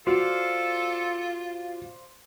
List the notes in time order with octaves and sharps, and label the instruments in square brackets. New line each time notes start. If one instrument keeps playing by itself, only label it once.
[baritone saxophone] F4 [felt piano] F#4 [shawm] A4 [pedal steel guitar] C5 D5 F5